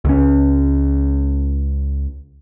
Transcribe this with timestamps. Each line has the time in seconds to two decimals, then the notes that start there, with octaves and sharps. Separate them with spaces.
0.05 C#2 C#4